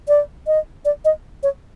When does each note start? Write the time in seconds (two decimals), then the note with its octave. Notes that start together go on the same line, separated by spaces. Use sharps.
0.08 D5
0.47 D#5
0.85 D5
1.05 D#5
1.43 C#5